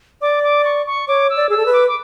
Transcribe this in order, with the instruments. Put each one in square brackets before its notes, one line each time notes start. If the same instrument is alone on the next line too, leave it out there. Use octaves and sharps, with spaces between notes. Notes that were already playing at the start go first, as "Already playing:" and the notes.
[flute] D5 [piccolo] D6
[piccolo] D6
C#6
C#6
[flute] C#5 [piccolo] D6
[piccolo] E6
[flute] D5
[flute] G#4 [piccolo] E6
[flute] A4
B4
[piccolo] D6
D6